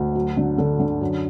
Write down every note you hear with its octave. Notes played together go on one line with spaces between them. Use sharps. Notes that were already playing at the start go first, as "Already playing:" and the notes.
Already playing: D2
F#3
D3
D3 A4
D3
F#2